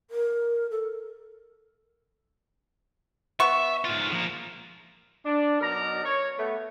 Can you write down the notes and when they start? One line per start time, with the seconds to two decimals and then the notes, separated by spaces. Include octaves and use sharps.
0.11 A#4
0.71 A4
3.40 B3 E5 C#6
3.85 G#2 F4
4.12 F3 A#3
5.25 D4
5.60 B2 F#3 D#4 A#4 D5 A#5
6.04 C#5
6.37 A3 B3